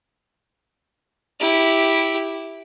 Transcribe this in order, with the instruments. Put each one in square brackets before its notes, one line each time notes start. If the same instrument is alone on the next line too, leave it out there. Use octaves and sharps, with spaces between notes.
[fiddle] E4 G4